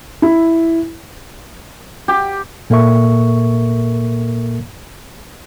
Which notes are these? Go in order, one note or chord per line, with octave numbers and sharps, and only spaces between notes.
E4
G4
A#2 A#3 A4 A#4 E5 C#6